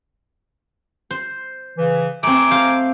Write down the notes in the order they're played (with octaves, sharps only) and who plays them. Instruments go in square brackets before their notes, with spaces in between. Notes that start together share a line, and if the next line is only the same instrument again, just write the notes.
[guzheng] C5
[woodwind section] C#3 E3
[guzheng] A3 C4 [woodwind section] G#5 A#5 D6
[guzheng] C5 F5